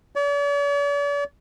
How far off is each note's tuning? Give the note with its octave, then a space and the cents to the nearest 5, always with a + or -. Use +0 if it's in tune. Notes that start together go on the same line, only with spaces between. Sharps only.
D5 -45